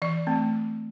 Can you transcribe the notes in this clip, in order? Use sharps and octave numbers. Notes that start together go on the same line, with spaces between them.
E3 D5
A3 C4